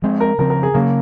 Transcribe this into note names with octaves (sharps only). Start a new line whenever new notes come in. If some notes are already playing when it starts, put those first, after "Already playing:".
F3 G#3 C4
A#4
C#3 F3 C4 A#4
A#4
G#4
C#3 F#3 A#3 C#4